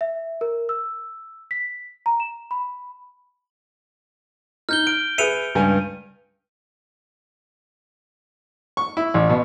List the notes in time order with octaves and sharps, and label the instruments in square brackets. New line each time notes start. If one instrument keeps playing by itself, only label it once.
[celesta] E5
A#4
E6
B6
A#5
E7
B5
[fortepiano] D#4 [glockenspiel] F6 G6 G7
[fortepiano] F6 [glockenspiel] D7
[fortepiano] G#4 B4 E5 [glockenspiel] C#7 D#7 F7
[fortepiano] C#2 G2 G#5
C#6
E4
A1
B2